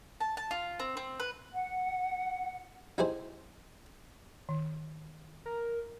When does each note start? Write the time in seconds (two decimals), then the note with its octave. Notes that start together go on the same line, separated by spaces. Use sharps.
0.21 A5
0.37 A5
0.51 F4
0.80 C4
0.97 C4
1.20 B4
1.52 F#5
2.98 D#4 E4 G4 G#4 C5
4.49 D#3
5.46 A#4